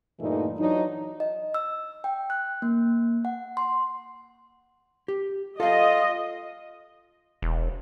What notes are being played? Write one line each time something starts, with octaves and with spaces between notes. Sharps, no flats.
G2 A#2 E3 A3 D#4 E4
E3 F#3 D4 D#4
D#5
E6
G5
F#6
A#3
F#5
C6
G4
F4 A4 D#5 F5
E1